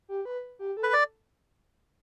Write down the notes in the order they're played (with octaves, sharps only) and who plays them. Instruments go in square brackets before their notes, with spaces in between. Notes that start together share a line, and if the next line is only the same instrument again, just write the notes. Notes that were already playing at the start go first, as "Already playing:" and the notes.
[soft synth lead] G4
B4
G4
A4
[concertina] B4
D5